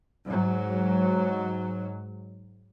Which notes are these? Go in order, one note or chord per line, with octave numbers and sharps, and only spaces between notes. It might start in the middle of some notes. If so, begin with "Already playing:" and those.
G#2 F#3